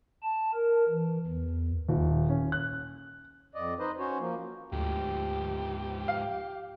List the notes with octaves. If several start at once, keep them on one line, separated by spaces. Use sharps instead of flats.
A5
A#4
E3
E2
D#1
C#4
F#6
F2 D5 D#5
D#4 B4 C5 D#5
C#4 F#4 C5 C#5
F3 A#3
D2 G#2 F3 G4
F5